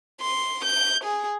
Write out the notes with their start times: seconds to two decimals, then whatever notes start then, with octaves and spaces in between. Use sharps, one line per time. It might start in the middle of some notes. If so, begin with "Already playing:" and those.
0.21 C6
0.65 G6
1.04 G#4